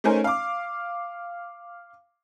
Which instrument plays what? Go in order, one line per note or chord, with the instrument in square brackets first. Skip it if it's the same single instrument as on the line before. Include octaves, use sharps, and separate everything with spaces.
[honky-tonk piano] A3 C#4 D#4 A#4 C5 G#5
F5 D6